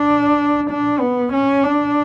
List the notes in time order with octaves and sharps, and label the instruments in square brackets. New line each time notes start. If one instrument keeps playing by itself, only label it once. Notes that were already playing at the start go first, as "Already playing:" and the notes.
Already playing: [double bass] D4
D4
B3
C#4
D4